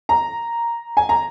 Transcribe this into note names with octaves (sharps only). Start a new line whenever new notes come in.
A#5
G#5
A#5